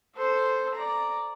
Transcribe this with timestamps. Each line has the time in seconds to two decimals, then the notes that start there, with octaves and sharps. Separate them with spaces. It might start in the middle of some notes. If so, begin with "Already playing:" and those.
0.15 A4 C5
0.75 D5 A#5